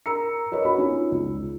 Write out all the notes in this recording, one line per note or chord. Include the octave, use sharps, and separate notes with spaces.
A#4 A#5 E6 C#7
A#4 B4 C#5 D#5
F#4 B5
C#4 D#4 F4
C#2